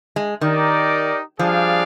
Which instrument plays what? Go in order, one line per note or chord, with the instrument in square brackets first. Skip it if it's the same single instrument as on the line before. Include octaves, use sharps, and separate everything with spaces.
[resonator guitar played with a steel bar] G#3
[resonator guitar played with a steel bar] D#3 [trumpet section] D#4 G4 A#4 D5
[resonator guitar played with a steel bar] F3 [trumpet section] G3 D4 G#4 D5 F5